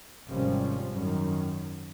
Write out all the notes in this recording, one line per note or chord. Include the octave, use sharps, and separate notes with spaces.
G#1 C3 F3 G3 C#4
F#2 D#3